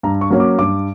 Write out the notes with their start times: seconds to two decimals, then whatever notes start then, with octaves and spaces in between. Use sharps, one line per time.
0.03 G2 A#5
0.21 C#6
0.31 F#3 A#3 C#4
0.40 D6
0.59 G2 D6